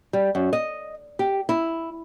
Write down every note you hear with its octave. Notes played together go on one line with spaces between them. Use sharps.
G3
F#2
D#5
G4
E4